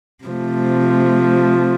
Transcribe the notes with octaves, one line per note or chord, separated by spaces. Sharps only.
C3 F3 A3